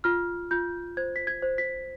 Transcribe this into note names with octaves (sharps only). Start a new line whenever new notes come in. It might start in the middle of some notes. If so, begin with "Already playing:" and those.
F4 F6
F4 G6
C5 G#6
B6
G#6
C5
B6